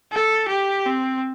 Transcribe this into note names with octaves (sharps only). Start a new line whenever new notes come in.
A4
G4
C4